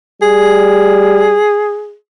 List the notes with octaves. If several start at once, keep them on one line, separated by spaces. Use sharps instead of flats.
G3 G#4